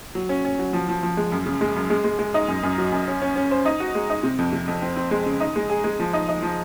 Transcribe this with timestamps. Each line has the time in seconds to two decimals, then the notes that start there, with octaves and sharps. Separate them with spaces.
0.15 F#3
0.29 C#4
0.45 C#4
0.59 F#3
0.73 F3
0.89 F3
1.03 F3
1.17 G#3
1.32 F#2
1.46 C#3
1.61 G#3
1.76 F#2
1.90 G#3
2.04 G#3
2.19 G#3
2.34 D#4
2.48 F#2
2.63 F#2
2.78 F#3
2.92 F#2
3.07 C#4
3.22 C#4
3.36 C#4
3.51 C5
3.65 D#4
3.80 F#4
3.95 G#3
4.10 D#4
4.23 C3
4.38 F2
4.53 C3
4.68 F2
4.82 C4
4.96 C4
5.11 G#3
5.26 C#3
5.40 D#4
5.56 G#3
5.70 G#4
5.84 G#3
6.00 F3
6.13 D#4
6.28 D#4
6.42 F3